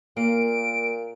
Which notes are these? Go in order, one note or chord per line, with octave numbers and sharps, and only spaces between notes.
A#2 A#3 D7